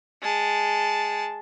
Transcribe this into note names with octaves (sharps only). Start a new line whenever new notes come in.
G#3 A5